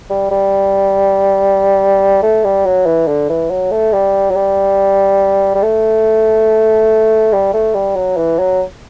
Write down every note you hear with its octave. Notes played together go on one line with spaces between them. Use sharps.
G3
G3
A3
G3
F#3
E3
D3
E3
F#3
A3
G3
F#3
G3
G3
A3
G3
A3
G3
F#3
E3
F#3